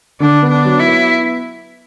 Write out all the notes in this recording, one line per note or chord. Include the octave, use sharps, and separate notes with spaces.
D3 D4
B3
D4
F#3
E4
B3